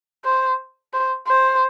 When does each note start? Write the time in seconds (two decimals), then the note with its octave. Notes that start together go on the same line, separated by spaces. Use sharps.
0.25 C5
0.93 C5
1.27 C5